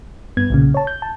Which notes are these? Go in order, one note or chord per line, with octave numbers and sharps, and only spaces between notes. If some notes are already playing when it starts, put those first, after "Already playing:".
G2 B3 G#6
B1 A#2 C#3
C#5 A5
G6
A5